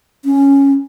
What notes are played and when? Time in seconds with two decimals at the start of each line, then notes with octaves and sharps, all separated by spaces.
0.25 C#4